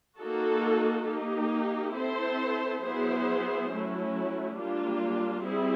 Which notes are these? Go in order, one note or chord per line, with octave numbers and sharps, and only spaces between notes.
A#3 D#4 F#4 A4
A#3 D#4 G4
C4 E4 A4 C5
F#3 B3 E4 G#4 C5
F#3 A3 C#4 E4
G3 A#3 D4 F4
G3 C4 E4 G#4